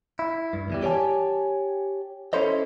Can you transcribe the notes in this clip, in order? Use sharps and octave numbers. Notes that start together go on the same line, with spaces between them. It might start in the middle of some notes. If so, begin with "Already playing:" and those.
E4
G2
E2 E3 G3
G4 C#5 D5 G#5 A5
C#4 E4 A4 C5 C#5 D#5